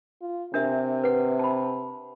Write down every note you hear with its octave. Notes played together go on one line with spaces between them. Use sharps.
F4
C3 D4 A#4 E5
B4 F#5
A5 B5